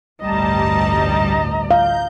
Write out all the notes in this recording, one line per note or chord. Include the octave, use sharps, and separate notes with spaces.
A1 D2 G2 G3 D#5 A5 A#5
F5 G6